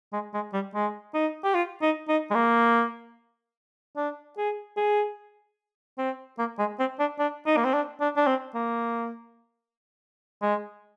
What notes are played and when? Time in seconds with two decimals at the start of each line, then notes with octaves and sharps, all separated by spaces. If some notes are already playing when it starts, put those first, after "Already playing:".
0.13 G#3
0.34 G#3
0.54 G3
0.75 G#3
1.14 D#4
1.44 G4
1.55 F4
1.82 D#4
2.09 D#4
2.31 G#3
2.35 A#3
3.97 D4
4.37 G#4
4.77 G#4
5.98 C4
6.39 A#3
6.59 G#3
6.79 C4
7.00 D4
7.19 D4
7.47 D#4
7.57 A#3
7.65 C4
7.74 D4
8.01 D4
8.17 D4
8.27 C4
8.54 A#3
10.42 G#3